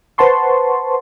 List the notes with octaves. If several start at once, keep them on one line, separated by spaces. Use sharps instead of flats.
B4 C5 F#5 A5 C6 C#6